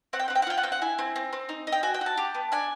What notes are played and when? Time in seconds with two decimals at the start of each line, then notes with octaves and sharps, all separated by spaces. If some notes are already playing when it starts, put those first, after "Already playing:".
0.13 C4 F#5
0.20 G5
0.28 C4 F#5
0.35 G5
0.42 F#5
0.47 F4 G5
0.57 F#5
0.63 C4 G5
0.72 F#5
0.81 E4 G#5
0.99 C4
1.16 C4
1.33 C4
1.49 D#4
1.67 D#4
1.72 G5
1.83 F#4 G#5
1.94 G5
2.01 F#4
2.06 A5
2.17 G4
2.35 B3
2.52 D4 G#5